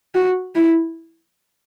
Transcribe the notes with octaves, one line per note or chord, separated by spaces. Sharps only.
F#4
E4